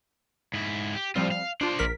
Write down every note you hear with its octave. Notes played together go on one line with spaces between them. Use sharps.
G#2 E4
G4
A2 F3 G3 C4 F4
F5
D4 F4 C5 D5
A#1 A#4 B6